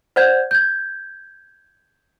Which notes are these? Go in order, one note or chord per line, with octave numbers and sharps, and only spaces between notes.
C5 D5 F#5 G6 G#6
G6 G#6